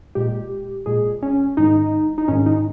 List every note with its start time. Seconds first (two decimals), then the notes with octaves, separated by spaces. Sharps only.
0.15 A#2 G#3 G4
0.86 A#2 G#3 G#4
1.22 C#4
1.57 G#2 D#3 G#3 D#4
2.18 D#4
2.28 G#2 D#3 G#3 C#4
2.46 D#4